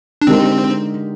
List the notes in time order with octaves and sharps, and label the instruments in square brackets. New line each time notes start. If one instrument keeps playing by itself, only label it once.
[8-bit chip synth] D4
[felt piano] D3 G#3 D#4 G4 A#4 [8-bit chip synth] C4